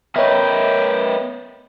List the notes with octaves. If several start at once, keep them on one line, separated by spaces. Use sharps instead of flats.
B3 A#4 B4 C#5 D#5 E5 G5